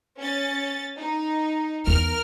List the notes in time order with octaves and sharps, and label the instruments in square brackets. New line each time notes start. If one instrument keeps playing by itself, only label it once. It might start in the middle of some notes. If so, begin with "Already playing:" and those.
[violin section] C#4 A6
D#4
[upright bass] E2 [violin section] A#4 F6